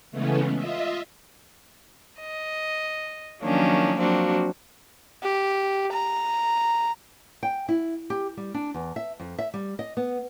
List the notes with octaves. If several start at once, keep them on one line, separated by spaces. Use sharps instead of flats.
C#3 E3 G#3 A3 B3 C#4
F4 D#5 E5
D#5
D#3 F3 F#3 A#3 C#4 D4
F3 F#3 A#3 C4 D4 F#4
G4
A#5
G5
E4
G4
G3
D4
E2
E5
F2
E5
G3
D#5
B3